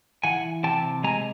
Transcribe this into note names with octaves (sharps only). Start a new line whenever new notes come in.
E3 F#5 G#5
C3 G5 A5
G#3 G#5 A#5